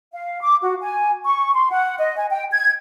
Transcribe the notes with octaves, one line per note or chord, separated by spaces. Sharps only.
F5
D6
F#4
G#5
C#6
C6
F#5
D#5
G#5
G5
G#6